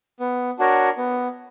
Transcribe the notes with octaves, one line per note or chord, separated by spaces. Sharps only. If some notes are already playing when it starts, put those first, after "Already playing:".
B3
D4 F#4 A#4 C#5
B3